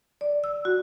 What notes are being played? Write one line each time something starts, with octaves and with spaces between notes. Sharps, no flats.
D5
E6
F#4